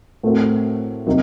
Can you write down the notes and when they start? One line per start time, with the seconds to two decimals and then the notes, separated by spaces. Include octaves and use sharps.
0.23 A2 A3 C4 F#4 A#4
1.06 C3 F#3 A#3 D#4